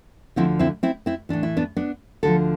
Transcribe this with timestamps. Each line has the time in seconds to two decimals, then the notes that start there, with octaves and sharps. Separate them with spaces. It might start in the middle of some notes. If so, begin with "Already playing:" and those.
0.36 D2 D3 F3 C4 E4
0.59 C4 E4
0.83 C4 E4
1.06 C4 E4
1.29 A2 E3 D4
1.43 E4
1.57 B3 D4
1.77 B3 D4
2.23 D2 D3 F3 A4